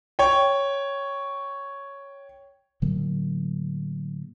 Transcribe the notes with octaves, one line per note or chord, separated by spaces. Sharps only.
C#5 G5
A2 D3 F#3 A#3